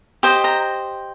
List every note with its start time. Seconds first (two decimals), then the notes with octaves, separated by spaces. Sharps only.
0.23 G4 C5 D#5
0.44 A#5